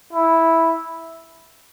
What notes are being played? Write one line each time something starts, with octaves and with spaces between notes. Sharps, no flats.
E4